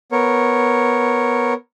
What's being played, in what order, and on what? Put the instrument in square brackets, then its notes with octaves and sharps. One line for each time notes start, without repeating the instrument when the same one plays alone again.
[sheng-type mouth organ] B3 A#4 C#5